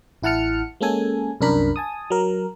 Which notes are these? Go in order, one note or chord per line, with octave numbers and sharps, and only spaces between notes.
A1 E4 F#5 A5 F6 C#7
G#3 A#3 C#4 A4 G#5
C2 F#2 D4 A#4 B5
G#5 A5 D#6
F#3 A#4